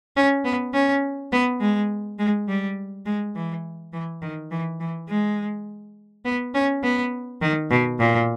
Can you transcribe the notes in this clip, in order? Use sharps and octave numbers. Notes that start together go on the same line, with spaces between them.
C#4
B3
C#4
B3
G#3
G#3
G3
G#3
E3
E3
D#3
E3
E3
G#3
B3
C#4
B3
D#3
B2
A#2